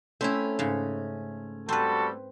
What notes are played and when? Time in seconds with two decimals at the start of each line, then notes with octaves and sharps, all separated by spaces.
0.21 A3 C4 C#4 E4
0.59 G#2 C#3
1.69 G3 C4 F#4 A4 B4